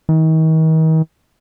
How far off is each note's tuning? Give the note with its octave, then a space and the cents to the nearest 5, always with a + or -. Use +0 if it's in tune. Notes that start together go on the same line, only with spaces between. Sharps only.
D#3 +40